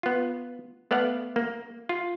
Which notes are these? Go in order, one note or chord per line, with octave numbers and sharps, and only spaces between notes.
B3 F4
A3 B3 D5 F5 F#5
A#3
F4